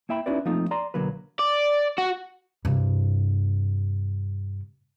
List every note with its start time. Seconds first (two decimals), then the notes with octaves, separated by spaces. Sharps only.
0.09 A#3 E4 E5 G5 B5
0.26 C#4 D#4 E4 F#4 B4 D5
0.45 F3 A3 A#3 C4 D#4 F4
0.71 D5 A#5 C6
0.94 B1 D3 F#3 A#3 B4
1.39 D5
1.98 F#4
2.65 G2 C3